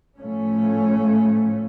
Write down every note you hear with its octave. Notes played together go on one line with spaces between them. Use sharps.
A2 F3 A3 C#4